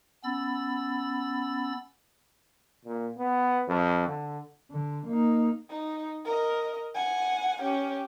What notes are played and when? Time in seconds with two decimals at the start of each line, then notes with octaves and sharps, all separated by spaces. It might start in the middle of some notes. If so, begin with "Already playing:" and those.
0.24 B3 C#4 B5 E6 A6
2.85 A#2
3.18 B3
3.69 F2
4.08 D3
4.71 D3
5.06 A#3 D#4
5.70 D#4
6.25 A#4 D#5
6.95 F#5 G#5
7.62 C#4 G4